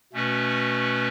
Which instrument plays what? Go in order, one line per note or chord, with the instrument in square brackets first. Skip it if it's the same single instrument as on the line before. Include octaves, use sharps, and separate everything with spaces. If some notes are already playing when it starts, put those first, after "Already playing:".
[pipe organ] B2 A3 C#4 F#4 B4